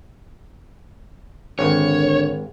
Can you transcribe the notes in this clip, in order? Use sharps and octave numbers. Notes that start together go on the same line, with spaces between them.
G#1 D3 C#5